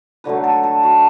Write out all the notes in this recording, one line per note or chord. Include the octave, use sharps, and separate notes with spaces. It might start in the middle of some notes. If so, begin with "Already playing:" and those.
D3 F#3 A3 B4
A4
A4
F#4